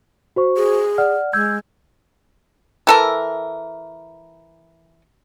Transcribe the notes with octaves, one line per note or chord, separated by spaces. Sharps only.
F#4 C5 C#6
G#4
D5 F#5 F6
G#3 E6 G6 G#6
E3 A4 A#4